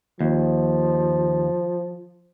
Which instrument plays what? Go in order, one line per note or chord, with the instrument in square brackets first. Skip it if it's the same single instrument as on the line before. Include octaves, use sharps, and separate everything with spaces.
[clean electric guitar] D#2 [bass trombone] F3